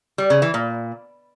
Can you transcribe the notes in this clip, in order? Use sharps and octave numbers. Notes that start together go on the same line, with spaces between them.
G3
C#3
E3
A#2